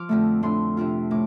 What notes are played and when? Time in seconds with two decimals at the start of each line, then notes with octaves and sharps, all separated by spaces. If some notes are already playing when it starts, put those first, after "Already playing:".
Already playing: F3 D6 F6
0.09 F2 D3 A3
0.43 A2 A3 D4 C6
0.77 C3 F3 D4 F4
1.11 A2 D6